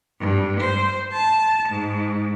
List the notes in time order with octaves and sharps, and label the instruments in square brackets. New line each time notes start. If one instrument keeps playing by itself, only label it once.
[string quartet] G2
C5
A5
G#2